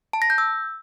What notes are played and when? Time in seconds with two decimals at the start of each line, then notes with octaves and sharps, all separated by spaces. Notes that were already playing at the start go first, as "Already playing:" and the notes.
0.13 A5
0.22 A#6
0.30 G6
0.38 E6